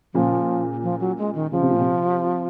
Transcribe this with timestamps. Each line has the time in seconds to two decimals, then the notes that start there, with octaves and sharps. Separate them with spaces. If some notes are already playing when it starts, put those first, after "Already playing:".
0.14 A#2 C#3 F3
0.83 F3
1.00 F#3
1.18 G#3
1.35 D#3
1.52 C#3 F3
1.62 C3
1.71 A#2
1.80 C3